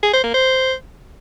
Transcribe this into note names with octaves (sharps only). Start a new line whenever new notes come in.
G#4
C5
A#3
C5